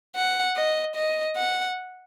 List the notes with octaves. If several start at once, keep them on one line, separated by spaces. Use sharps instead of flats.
F#5
D#5
D#5
F#5